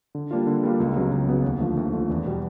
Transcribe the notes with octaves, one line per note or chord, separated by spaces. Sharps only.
D3
G3 A#3 D4 F4
D3
G3 A#3 D4 F4
C#2
C#3 F#3 B3
C#2
C#3 F#3 B3
D#2
D3 F3 A3
D#2
D3 F3 A3
E2
B2 G3